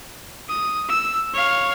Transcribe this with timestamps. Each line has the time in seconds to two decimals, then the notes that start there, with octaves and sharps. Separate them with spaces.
0.49 D#6
0.89 E6
1.34 C#5 F5